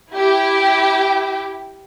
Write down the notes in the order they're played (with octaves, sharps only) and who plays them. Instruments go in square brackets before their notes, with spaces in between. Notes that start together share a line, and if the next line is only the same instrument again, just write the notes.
[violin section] E4 G4 G5